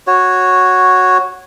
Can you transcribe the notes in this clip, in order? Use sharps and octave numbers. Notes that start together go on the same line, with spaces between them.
F#4 C#5